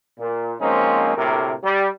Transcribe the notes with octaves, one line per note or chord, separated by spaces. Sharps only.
A#2
F3 G#3 A#3 C4 C#4 D#4
D2 A2 C3 A#3 A#4
G3